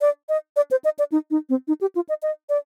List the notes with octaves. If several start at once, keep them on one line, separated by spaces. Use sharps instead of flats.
D5
D#5
D5
C5
D#5
D5
D#4
D#4
C4
D#4
G4
F4
D#5
D#5
D5